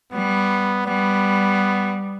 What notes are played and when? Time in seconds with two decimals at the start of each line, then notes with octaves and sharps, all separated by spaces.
0.12 G3 B3
0.86 G3 B3